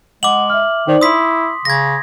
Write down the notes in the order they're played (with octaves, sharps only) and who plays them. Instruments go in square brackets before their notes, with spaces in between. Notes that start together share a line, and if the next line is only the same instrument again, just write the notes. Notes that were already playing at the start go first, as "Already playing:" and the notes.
[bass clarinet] G#3 [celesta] F#5 [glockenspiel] D6 F#7
[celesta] E5 F6
[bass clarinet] D#3 [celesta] D#4 C5 D5
[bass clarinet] E4 [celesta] C6 [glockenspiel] D#6 B6
[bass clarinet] C#3 [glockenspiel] G#6 A#6